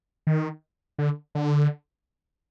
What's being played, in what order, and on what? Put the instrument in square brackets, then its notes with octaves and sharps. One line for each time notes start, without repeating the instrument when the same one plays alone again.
[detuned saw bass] D#3
D3
D3